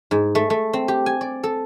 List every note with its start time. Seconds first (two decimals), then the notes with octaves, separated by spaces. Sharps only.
0.11 G#2
0.35 A3
0.50 A3
0.73 C4
0.88 G4
1.06 G#5
1.21 D5
1.43 A4